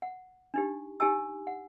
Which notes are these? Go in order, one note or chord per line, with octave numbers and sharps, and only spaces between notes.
F#5
D4 D#4 G4
D#4 G4 G#5 A5 E6
F#5